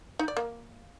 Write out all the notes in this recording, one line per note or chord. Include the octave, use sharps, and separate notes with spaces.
D#4
D5
A#3